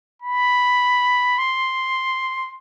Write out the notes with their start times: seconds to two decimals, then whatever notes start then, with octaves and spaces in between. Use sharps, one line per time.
0.22 B5
1.38 C6